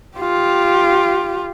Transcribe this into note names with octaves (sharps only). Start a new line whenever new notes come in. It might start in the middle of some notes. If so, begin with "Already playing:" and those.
F4 G4